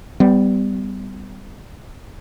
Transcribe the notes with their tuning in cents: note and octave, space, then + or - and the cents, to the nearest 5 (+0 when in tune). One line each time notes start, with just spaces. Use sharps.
G3 +0 B3 +35